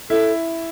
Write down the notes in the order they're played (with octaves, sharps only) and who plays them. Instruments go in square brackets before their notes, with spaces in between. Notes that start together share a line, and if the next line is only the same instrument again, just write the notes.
[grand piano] E4 [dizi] A4